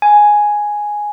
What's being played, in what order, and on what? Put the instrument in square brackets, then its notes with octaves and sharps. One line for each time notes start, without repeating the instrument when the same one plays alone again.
[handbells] G#5